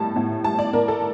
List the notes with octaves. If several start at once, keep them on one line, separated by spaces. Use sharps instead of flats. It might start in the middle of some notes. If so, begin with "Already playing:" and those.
Already playing: A2 G3 A5
A2
G3 A5
D5
A2 A#4
A4